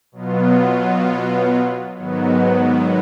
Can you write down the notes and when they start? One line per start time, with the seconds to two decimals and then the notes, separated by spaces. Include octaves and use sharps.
0.12 B2 F#3 B3 F4
1.97 G#2 D#3 F#3 B3